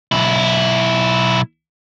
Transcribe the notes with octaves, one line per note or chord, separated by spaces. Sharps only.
B1 E4